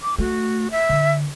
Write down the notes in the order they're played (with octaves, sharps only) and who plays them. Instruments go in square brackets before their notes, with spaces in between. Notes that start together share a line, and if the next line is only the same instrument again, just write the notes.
[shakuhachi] D6
[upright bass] A3 [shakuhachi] F#4
[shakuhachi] E5
[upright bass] D3